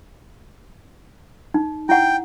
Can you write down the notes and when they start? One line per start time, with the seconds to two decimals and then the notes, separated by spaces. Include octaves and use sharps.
1.54 D#4
1.89 E4 F#5 G5